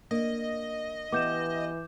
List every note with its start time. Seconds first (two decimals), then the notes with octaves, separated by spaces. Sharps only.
0.11 A#3 D4 D#5
1.12 E3 B3 G4 E5 D6 G6 E7